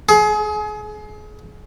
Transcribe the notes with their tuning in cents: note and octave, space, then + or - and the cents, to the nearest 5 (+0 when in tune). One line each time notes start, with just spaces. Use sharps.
G#4 +30